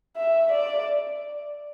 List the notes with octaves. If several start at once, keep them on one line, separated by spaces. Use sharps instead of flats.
E5
D5